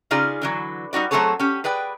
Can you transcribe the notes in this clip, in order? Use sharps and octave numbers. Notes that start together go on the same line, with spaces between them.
C#3 D#4 F4 G#4 D5
D3 E3 F#3
G3 D#4 F#4 D5
F#3 A3 C4 G#4 A4 C#5
C#4 G4
G#4 B4 D5 G5